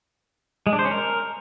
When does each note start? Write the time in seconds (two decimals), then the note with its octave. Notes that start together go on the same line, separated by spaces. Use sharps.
0.67 G#3
0.73 D4
0.79 C5
0.85 C#4
0.91 A#4